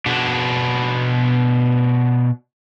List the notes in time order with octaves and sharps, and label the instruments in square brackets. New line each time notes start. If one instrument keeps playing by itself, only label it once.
[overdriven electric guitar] B2 D4